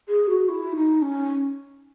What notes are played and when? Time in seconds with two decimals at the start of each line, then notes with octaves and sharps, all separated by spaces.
0.08 G#4
0.29 F#4
0.49 E4
0.75 D#4
1.02 C#4